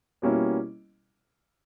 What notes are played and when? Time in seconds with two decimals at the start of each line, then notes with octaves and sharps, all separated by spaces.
0.22 B2 G3 A#3 C#4 E4